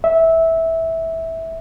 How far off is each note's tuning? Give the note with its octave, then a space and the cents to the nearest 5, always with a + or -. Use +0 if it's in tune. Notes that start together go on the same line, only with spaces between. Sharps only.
E5 -15